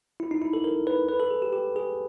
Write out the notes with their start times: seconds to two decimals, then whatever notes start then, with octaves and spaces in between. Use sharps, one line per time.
0.20 E4
0.31 D#4
0.42 E4
0.53 A4
0.64 A#4
0.87 B4
1.09 B4
1.20 A4
1.31 G#4
1.42 G4
1.53 G4
1.76 G#4